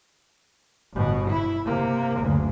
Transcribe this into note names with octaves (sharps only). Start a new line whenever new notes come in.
G1 B2
E4
C3 A#3
F#1 D2